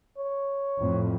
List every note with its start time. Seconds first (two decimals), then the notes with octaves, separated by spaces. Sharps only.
0.18 C#5
0.78 F2 A2